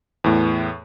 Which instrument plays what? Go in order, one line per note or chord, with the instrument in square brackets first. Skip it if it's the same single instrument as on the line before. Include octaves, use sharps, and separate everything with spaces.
[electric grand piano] E2 A2